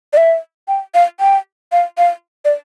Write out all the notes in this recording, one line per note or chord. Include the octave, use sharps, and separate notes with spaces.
D5
E5
G5
F5
G5
F5
F5
D5